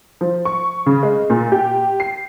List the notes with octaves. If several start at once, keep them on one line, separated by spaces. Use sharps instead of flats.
F3
C#6
C#3
G#3
A#2
G4
C7